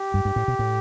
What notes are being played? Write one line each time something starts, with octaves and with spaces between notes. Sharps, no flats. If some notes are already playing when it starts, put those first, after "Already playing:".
Already playing: G4
G2
G2
A2
B2
A2